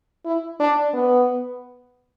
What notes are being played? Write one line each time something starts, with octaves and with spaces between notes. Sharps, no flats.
E4
D4
B3